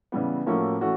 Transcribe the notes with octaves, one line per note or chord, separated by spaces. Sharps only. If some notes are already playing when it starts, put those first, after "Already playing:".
C#3 E3 G3 B3
A2 F3 A#3 C#4 F#4
E3 A3 C#4 F#4